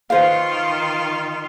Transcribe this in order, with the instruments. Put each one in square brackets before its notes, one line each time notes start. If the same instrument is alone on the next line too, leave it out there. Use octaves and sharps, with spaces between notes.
[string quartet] D#3 F4 [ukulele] B4 C5 F5